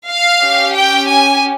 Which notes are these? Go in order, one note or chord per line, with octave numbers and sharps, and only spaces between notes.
F5
C#4 G4
G5
G#5